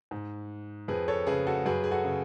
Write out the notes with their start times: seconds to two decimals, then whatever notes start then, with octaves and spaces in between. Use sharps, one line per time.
0.11 G#2
0.88 F2 G#4 B4
1.08 A4 C#5
1.27 C#3 G#4 B4
1.47 F#4 A4
1.66 F#2 G#4 B4
1.84 G#4
1.91 F#4 A4
2.04 C#3